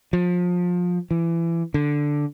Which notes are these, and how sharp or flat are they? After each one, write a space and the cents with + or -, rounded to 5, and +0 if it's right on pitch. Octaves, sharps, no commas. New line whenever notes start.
F3 +25
E3 +25
D3 +0